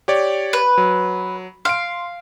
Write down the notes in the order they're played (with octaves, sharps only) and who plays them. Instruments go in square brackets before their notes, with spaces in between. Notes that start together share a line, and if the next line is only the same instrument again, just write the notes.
[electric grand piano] G4 C#5 D5
[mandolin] B4
[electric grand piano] F#3
[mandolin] F5 [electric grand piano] C6 D7